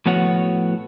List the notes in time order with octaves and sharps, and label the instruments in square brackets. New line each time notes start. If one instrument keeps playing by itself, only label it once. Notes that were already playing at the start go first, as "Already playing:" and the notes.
[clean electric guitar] A2 F3 B3 F#4 C#5 F#5